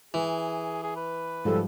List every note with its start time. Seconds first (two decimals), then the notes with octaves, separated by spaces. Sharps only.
0.14 E3 G#4
0.83 G#4
0.96 B4
1.45 G#2 F3 G3 A4